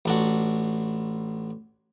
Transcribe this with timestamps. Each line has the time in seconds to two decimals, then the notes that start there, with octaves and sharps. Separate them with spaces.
0.05 A1 D4 F#4